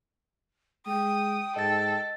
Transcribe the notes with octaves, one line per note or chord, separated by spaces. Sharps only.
G#3 G5 D#6
G#2 A4 D#5 A6